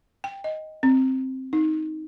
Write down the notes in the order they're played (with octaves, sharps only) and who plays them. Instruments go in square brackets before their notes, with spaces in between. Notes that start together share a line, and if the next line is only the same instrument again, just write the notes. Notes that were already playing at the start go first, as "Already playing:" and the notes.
[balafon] G5
D#5
C4
D#4